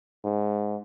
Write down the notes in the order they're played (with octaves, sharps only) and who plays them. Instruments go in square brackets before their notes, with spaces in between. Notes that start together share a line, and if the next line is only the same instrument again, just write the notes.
[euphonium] G#2